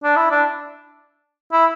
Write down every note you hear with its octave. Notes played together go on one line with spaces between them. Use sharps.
D4
E4
D4
E4